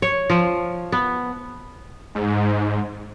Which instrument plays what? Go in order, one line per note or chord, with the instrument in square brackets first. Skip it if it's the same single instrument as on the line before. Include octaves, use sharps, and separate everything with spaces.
[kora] C#5
F3
B3
[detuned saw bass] G#2